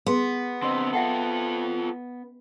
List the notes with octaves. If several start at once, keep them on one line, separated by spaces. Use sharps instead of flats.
B3 G#4 C6
D3 C4 D#5 C6
F4 A4 E5 F#5 G5